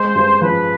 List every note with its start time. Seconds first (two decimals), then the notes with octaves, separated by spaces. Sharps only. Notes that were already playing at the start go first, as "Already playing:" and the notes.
Already playing: G#3 C5
0.15 G2
0.41 F3 B4